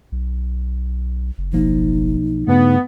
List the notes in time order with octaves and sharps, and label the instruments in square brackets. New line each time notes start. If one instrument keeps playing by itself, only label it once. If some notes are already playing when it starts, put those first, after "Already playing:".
[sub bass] B1
F#1
[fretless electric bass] B1 F3 A#3 [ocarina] D#4
[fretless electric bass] G2 A3 [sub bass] C#3 [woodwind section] B3